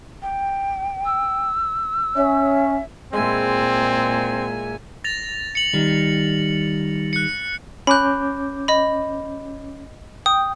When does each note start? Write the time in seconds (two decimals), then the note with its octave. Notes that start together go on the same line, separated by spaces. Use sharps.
0.22 G5
1.05 E6
2.16 C#4 E5
3.13 A#2 G#3 C4 E4 G#5
5.04 A6 A#6 F7
5.55 C#7 F#7
5.73 D#3 G3
7.13 F#6 C#7
7.87 C#4 B5 D6 F#6 G6
8.68 D#5 B5
10.26 G5 D#6